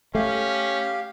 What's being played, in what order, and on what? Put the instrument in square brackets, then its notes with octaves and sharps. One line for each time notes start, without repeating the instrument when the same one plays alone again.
[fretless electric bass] A3 [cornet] C#4 [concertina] G4 F5